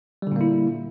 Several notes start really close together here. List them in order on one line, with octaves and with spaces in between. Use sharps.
G3 D3 A#2 A#3 E4